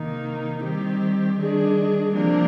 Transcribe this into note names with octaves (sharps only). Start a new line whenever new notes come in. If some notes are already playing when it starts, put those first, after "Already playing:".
Already playing: C3 D#3 A#3 D#4
D#3 G3 C4 G4
D#3 G3 D4 G#4
C3 F3 A#3 D4